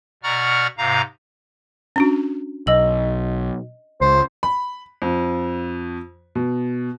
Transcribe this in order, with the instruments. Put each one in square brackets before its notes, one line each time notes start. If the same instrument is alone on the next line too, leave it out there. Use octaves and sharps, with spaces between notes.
[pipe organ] B2 D5 F#5 A#5 C#6 F6
G#2 C3 F5 A#5
[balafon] C#4 D4 F#4
[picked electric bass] B1 [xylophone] D#5 E6 F#7
[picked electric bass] C#2 [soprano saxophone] C5
[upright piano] B5
F2
B2